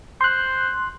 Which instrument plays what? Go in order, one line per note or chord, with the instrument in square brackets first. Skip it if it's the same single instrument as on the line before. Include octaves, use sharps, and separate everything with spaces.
[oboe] C5 [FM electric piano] C6 F#6